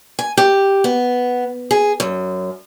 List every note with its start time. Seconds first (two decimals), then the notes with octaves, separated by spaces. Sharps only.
0.19 G#5
0.37 G4
0.84 B3
1.71 G#4
2.00 F#2